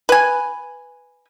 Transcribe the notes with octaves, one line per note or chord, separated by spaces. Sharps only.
B4 G#5